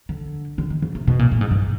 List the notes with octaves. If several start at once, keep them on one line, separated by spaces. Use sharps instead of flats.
D3
D3
D#3
C#3
C3
B2
A#2
A2
G#2
G2